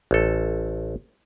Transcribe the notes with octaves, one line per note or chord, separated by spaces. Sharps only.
A1 A4